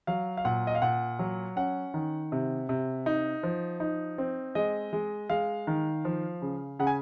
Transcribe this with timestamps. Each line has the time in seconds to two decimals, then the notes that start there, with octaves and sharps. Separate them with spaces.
0.07 F#3 F5
0.37 F5
0.45 A#2 F#5
0.67 D#5
0.75 F5
0.82 A#2 F#5
1.19 F#3
1.56 C#4 F#5
1.94 D#3
2.32 C3
2.69 C3
3.06 D#4
3.43 F3
3.80 D#4
4.18 C4
4.55 G#3 D#5
4.93 G#3
5.30 G#3 F5
5.67 D#3
6.05 F3
6.42 C#3
6.79 C#3 F#5
6.87 G#5